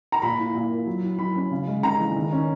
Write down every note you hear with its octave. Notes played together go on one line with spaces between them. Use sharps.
A#5
A#2 B5
E4
A#2
A#3
F#3
E4
F#3 B5
C#4
C#3
G#3
C#3 A#5
E3
D#3
C#4